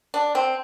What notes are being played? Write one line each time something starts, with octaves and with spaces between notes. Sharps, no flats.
D4
C4